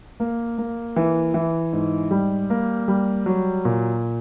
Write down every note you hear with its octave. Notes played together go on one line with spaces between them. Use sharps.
A#3
A#3
E3
E3
G#2
G3
A#3
G3
F#3
A#2